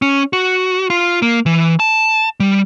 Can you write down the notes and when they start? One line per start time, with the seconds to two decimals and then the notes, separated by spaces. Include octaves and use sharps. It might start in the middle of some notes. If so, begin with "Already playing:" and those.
0.02 C#4
0.33 F#4
0.90 F4
1.22 A#3
1.46 E3
1.80 A5
2.40 G3